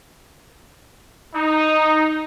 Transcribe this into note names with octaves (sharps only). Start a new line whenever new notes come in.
D#4